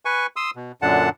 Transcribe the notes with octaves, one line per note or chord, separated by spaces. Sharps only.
B4 G#5 C#6
C6 D#6 E6
B2
F#2 A#2 D3 D4 F#5 A5